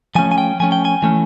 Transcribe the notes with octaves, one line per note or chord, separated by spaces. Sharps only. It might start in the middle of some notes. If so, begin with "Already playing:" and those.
F3 A3 C#4 G#5
G#5
G5
F3 A3 C#4 G#5
G5
G#5
E3 A3 C#4